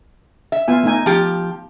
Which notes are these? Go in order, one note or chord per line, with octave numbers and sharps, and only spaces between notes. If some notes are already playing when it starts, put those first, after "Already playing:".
E5
B3 F4 G#5
A3 D#4 G#5
F3 G4